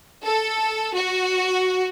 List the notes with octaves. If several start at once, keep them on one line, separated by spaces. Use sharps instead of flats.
A4
F#4